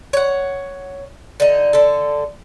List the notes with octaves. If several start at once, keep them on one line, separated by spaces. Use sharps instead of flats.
C#5 F#5
D3 D#4
D3 A4